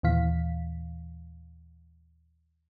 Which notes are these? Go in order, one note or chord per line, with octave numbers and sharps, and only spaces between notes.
D#2 A#2 E3 F5 B6